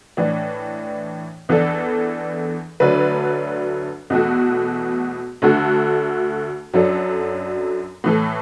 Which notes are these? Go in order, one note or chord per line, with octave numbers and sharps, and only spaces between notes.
A2 E3 D4
E2 E3 D4 A4
D2 D3 F#3 D4 B4
E2 B2 A3 F#4
D2 D3 A3 F#4 A4
F#2 F#3 D4 A4
A2 E3 A3